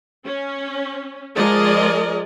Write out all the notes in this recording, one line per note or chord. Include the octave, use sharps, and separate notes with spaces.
C#4
F3 G#3 G#4 A#4 D5 D#5